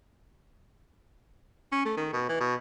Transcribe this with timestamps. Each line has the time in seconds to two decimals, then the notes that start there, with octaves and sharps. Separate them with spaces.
1.72 C#4
1.85 A3
1.97 D#3
2.13 B2
2.29 E3
2.40 B2